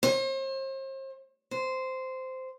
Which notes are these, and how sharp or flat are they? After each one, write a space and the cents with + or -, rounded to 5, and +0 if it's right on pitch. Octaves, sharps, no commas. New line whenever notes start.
C5 +40
C5 -10